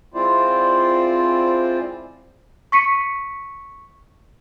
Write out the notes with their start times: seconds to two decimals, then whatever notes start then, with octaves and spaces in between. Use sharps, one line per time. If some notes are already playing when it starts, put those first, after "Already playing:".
0.14 G#3 C4 E4 F4 C5 D5
2.72 C#6 B6 C#7 D#7